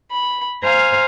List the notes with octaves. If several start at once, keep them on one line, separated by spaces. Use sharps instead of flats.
B5
C5 F5 G#5 A#5